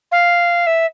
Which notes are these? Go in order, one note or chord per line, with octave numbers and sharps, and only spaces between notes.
F5
E5